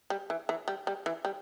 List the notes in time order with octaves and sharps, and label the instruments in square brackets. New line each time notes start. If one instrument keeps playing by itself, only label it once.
[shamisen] G3
E3
E3
G3
G3
E3
G3